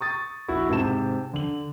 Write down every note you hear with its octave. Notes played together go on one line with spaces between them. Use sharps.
C#6 D#6 A6
A#1 E4 F#4
G#2 C3 A5 E7
D3 F#7